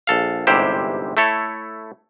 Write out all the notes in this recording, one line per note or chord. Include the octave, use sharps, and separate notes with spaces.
A#1 A4 F5
G1 G#2 C3 E4 G4 C5
A3 E4 A4 C#5